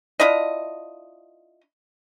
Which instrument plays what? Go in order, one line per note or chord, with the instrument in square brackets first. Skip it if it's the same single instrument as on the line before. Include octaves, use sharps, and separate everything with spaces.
[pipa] D4 E4 F4 D#5